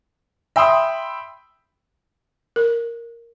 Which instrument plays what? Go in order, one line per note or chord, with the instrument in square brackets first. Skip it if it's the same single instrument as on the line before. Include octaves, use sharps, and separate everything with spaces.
[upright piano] E5 G5 B5 C6 D#6 E6
[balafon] A#4